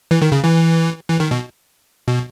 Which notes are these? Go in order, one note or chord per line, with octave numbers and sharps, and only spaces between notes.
E3
D#3
C#3
E3
E3
D#3
B2
B2